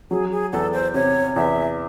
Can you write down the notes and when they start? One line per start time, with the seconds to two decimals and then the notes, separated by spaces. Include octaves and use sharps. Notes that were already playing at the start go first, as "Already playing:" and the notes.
0.11 F#3 G#4
0.32 G#4
0.53 E2 A4
0.73 C5
0.94 C3 C#5
1.36 E2 E5